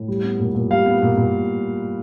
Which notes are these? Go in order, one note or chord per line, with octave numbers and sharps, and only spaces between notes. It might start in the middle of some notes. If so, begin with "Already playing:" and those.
Already playing: A2
G3
B3
A#2
A#2
G3 F5
B3
A#2
A#2